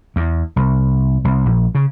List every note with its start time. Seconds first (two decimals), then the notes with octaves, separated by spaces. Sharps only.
0.16 E2
0.56 C2
1.24 C2
1.46 A#1
1.75 C#3